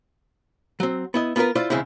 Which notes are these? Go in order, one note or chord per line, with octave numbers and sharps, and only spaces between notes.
F#3 C4
B3 E4 D#5
B3 F4 G4 A#4 B4
E4 F4 C5 D5
E2 C#3 G#3 C4 E4